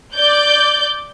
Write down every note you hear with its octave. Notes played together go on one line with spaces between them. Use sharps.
D5 G6